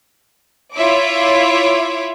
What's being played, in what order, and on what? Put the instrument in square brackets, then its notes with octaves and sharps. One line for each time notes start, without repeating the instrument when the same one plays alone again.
[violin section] E4 F4 C#5 E5 D6